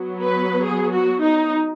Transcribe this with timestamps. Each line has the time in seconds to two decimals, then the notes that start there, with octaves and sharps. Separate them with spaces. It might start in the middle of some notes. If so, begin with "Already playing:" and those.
Already playing: F#3 B3
0.23 B4
0.65 G#4
0.92 F#4
1.21 D#4